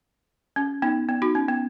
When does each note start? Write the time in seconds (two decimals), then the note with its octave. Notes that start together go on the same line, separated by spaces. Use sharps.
0.56 C#4
0.82 B3 D#4
1.09 B3
1.22 D#4 F#4
1.35 C#4
1.48 B3